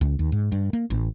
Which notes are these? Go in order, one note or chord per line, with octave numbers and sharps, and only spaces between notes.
C#2
D#2
G#2
G2
A#3
A1